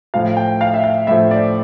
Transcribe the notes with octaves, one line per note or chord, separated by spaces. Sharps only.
A2 F3 F5
G5
F5
E5
F5
A2 F3 E5
D5